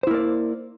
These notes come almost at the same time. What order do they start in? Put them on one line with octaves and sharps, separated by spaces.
C5 E4 A#3 D5